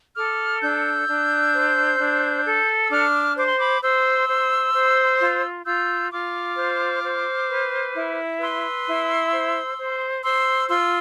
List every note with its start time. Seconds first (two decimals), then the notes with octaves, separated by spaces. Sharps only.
0.16 A4 D6 F6
0.62 D4 E6 G6
1.08 D4
1.54 C5
2.00 D4
2.45 A4
2.84 E6
2.91 D4 D6 F6
3.37 C5 D6
3.48 C6
3.58 B5 D6
3.83 C5 C6 E6
4.28 C5
4.74 C5
5.21 F4
5.66 F4 E6 G6
6.11 F4 D6 F6
6.57 C5
7.04 C5
7.49 B4
7.95 E4
8.41 B4 C6 E6
8.87 E4
9.32 C5
9.78 C5
10.24 C5 C6 E6
10.69 F4 C6 E6